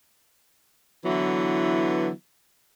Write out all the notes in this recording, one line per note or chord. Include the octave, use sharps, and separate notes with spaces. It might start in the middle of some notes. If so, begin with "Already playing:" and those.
D3 E3 F#3 B3 E4